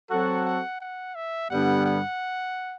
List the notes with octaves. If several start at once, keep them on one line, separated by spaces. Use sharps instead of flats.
F#3 C4 F#4 A4 F#5
F#5
F#5
E5
G2 D3 G3 B3 F#5
F#5